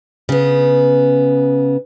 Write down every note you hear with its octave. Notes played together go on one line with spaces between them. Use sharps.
C#3 B3